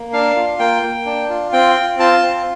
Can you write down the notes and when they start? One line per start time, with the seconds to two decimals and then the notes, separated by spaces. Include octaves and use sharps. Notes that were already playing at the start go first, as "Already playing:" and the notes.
Already playing: A#3
0.13 D4 F5
0.36 F4
0.59 A#3 G5
0.83 A#3
1.06 D4
1.29 F4
1.53 C4 G5
1.76 F4
1.99 F4 A5
2.23 C4